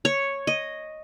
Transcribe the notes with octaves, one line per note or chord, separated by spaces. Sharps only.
C#5
D#5